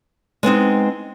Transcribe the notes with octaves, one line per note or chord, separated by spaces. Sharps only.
G#3 B3 C4 D#4